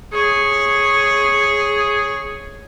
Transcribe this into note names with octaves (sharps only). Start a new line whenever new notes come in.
G#4 C#5